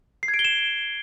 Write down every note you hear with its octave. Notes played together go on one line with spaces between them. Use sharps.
C7
G#6
D7
G7
E7